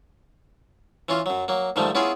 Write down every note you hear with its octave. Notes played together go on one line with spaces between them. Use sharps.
E3 C#4 F4
F#2 F#3
F#3 A#3
G#2 D#3 F3 G3 A3
B3 C#4 E4 F4 G#4